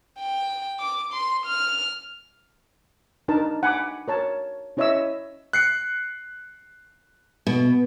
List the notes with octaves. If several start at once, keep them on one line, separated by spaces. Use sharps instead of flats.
G5
D6
C6
F6
D4 D#4 A#4 A5
F#5 G#5 B5 D6
A#4 C#5 A5
C#4 E4 C#5 D#5 E5 E6
F#6 C7 C#7
B2